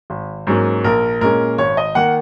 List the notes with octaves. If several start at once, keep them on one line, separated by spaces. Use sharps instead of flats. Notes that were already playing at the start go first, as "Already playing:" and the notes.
G#1
G#2 F#3 A#3 C#4
A#1 A#4
A#2 G#3 C#4 A#4
G#1 C#5
D#5
D#3 A#3 F#5